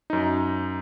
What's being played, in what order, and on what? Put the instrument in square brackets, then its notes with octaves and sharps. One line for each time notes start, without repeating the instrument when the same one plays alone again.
[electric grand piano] F#2 D#4